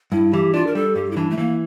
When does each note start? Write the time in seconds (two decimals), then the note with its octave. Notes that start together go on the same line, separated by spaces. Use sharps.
0.12 G2 E4
0.33 E3 G4
0.54 D4 F4
0.67 A#4
0.75 G3 A4
0.95 G2 G4
1.11 E4
1.16 E3 D4
1.30 A3
1.38 E3 A#3